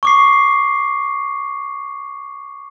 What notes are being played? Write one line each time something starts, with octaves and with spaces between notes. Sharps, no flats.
C#6 D6 C7